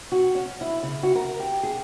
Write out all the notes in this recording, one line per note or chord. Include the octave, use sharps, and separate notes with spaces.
F#4
C#4
E4
C#3
F#4
A#4
G4
G#4